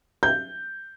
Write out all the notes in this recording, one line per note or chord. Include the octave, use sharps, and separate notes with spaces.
G6